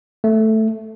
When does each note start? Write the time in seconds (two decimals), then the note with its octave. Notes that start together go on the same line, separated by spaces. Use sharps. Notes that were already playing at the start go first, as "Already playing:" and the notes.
0.24 A3